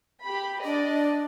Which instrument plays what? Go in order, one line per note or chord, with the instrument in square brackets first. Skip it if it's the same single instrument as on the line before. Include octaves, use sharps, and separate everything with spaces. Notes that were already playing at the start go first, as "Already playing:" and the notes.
[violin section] G4 B5
[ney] D4 [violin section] D5 D#5